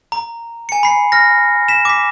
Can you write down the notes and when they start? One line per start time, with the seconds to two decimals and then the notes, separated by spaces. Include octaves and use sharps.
0.12 A#5
0.69 G#5 C#7
0.83 B5 C7
1.12 F6 A#6
1.68 B6 E7
1.85 D6 B6